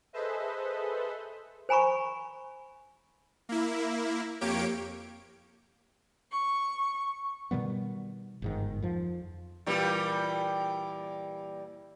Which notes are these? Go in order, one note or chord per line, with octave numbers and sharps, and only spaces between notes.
G#4 A4 B4 C5 D#5 E5
C5 G#5 A#5 B5 C#6
A#3 E4
F2 A#3 G4 C#5 D7
C#6
B2 D#3 G3 B3
G1 G#2 D#3
F2 F3
A#2 E3 G3